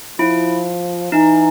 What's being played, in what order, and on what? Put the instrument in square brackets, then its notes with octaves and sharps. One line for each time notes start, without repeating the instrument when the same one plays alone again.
[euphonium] F3 [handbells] E4
[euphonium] E3 [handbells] D#4